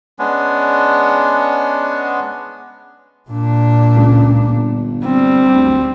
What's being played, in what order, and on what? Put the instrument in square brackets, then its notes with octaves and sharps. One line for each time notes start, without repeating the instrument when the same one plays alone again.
[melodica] G#3 B3 C#4 D4
[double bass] A#2 D4
[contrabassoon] C#2
G1
[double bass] G3 [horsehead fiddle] C4
[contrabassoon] D2